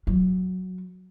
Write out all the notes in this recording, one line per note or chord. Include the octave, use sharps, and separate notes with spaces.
F#3